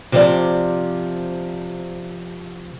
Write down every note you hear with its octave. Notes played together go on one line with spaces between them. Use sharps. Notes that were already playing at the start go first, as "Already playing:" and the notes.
C3 F3 D5